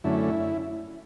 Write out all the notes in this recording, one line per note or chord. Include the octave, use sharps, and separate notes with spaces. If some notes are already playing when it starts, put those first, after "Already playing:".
F#2 D3 A3 C#4 E4